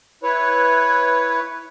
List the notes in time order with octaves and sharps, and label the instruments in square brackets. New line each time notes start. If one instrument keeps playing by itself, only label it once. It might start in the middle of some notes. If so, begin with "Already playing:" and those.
[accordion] E4 B4 C#5